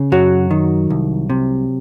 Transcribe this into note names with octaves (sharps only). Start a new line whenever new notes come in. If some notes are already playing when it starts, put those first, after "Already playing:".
Already playing: C#3
F#2 F#3 F#4
D#3
C2
C3